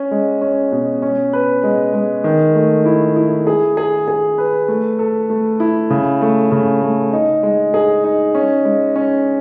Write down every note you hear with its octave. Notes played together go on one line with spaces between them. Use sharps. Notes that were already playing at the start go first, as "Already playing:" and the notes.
Already playing: C#4
G#3
C#4
B2
C#4
B4
G#3
G#3
D#3
A3
E4
E4
G#4
G#4
G#4
B4
A3
A4
A3
E4
C#3
A3
C#3
A3
D#4
G#3
G#4
D#4
C#4
G#3
C#4